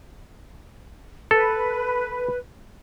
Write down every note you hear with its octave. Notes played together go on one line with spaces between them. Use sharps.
A4 B4